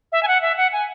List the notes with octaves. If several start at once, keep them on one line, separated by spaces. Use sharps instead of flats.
E5
G#5
F#5
E5
F#5
G#5